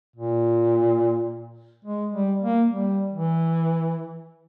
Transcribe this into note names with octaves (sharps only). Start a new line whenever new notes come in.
A#2
G#3
G3
A#3
G3
E3